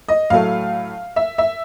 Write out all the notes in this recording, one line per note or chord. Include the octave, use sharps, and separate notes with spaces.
D#5
A2 F#3 A3 F5
E5
E5